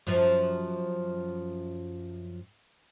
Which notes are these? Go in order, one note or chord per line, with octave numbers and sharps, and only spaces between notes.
F#2 F3